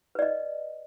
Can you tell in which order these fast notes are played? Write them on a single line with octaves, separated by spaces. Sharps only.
B4 D5 D#5